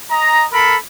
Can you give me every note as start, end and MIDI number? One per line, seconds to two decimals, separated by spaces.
0.11 0.45 75
0.11 0.45 82
0.53 0.76 69
0.53 0.76 70
0.53 0.76 83